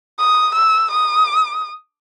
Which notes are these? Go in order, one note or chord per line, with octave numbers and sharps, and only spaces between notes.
D#6
E6
D#6